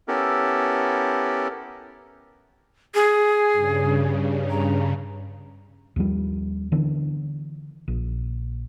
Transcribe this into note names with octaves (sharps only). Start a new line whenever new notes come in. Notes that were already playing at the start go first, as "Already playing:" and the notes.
B3 C#4 E4 G4 A4 A#4
G#4
G2 C#3
A#5
D#2 F3 G3
D3 E3 B3
A#1